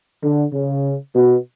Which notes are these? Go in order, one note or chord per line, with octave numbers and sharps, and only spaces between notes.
D3
C#3
B2